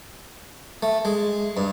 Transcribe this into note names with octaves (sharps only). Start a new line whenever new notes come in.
A3
G#3
G2